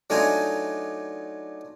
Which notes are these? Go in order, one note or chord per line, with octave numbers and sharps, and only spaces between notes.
F#3 A3 D4 D#4 F4 G#5